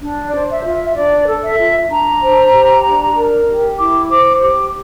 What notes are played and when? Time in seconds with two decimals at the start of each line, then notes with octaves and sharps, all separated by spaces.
0.02 D4
0.26 D5
0.33 C5
0.49 E5
0.64 F4
0.72 E5
0.89 E5
0.96 D4 D5
1.27 A4
1.43 E5
1.58 F4
1.90 D4 A#5
2.22 C5
2.53 G4
2.85 D4
3.17 A#4
3.47 G4
3.79 E4 D6
4.10 C5 D6
4.42 G4 D6